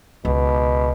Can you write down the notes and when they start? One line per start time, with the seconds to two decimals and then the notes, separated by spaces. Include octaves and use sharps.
0.25 C#2 B2